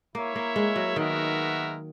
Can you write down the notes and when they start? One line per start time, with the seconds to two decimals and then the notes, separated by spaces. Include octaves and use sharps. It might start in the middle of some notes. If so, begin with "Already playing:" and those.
0.14 A#3 E4 A#4 C#5 E5
0.36 A#3
0.56 G#3
0.76 F#3
0.96 D#3 G#3 B3 F#4 A#4 E5